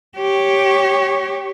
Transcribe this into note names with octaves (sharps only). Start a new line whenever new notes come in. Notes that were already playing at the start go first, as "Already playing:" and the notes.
G4 C#5